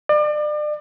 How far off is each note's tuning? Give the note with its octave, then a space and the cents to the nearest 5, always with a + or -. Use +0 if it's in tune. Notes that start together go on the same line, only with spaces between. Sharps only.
D5 +35